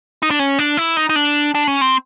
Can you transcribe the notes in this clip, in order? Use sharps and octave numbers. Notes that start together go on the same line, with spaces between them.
D#4
D4
C#4
D4
E4
D#4
D#4
D4
D4
C#4
C4